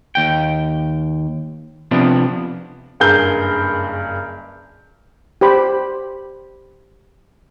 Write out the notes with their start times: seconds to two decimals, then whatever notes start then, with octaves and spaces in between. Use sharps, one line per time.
0.15 D#2 G5
1.91 C3 F3 B3 D4
3.00 F#1 G2 G#4 A#4 G6 G7
5.41 G4 C5 B5